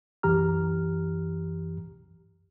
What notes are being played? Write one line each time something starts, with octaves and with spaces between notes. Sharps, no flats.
C2 F#2 E3 G4 A#5 F6